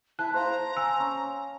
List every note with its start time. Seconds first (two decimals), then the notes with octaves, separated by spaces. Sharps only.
0.19 E4 A5 F#6
0.34 C5 F5 A#5
0.77 G#5 E6
0.99 C#4